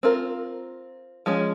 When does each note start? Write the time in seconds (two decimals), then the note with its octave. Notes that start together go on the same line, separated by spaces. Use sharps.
0.03 C4 F4 A#4
1.26 F3 G#3 C#4